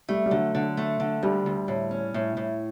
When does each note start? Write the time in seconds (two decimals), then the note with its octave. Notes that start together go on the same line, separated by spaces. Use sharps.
0.09 G3 A3
0.26 G3
0.31 D3 F#3
0.55 D3
0.77 A3
1.00 D3
1.23 D2 G3
1.46 D2
1.68 A2
1.91 C#4
2.14 A2
2.37 A2